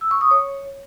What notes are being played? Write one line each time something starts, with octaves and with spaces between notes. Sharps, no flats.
E6
C#6
D#6
C#5